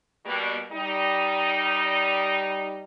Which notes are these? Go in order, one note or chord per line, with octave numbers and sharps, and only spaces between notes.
B2 G3 A#3
G3 D#4